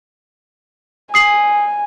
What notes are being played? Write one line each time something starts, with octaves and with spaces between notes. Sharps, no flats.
G#5 D#6 C7 F#7